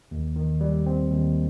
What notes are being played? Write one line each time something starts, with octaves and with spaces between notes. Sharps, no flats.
D#2
D#3
G3
C4
D#2